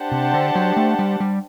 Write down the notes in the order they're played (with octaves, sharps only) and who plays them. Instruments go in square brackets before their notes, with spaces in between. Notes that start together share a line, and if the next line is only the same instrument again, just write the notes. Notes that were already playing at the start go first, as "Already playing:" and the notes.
Already playing: [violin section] D4 G4 C5 F#5 A5
[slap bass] C3
D3
F#3
A3
G3
G3